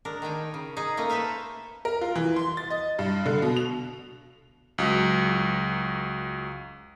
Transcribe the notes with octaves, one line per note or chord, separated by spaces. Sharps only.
G#3 D4 A#4
D#3 D#4 G5 G#5
C#3
D#4 G#4
A3 A#3 C#4 D#5
A4 B4 C5 E5 F5
A#4
F4
E3
C6
A6
D#5
G2
D3
B2
F7
C#2 F#3